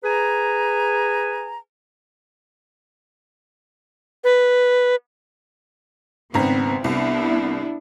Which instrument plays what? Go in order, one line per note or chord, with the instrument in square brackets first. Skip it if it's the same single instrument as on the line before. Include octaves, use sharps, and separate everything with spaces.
[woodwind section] G#4 B4 G#5 A#5
[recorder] B4
[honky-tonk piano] G#1 C#3 A#5 [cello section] B3 C4
[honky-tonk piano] C2 [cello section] B3 D4 E4